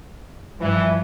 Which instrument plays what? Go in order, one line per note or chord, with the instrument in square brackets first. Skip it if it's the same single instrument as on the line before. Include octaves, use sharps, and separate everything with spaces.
[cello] G2 F3 [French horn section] E3